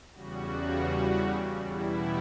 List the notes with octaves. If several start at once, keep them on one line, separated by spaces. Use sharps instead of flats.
E2 C#3 G3 F#4
E2 B2 G3 E4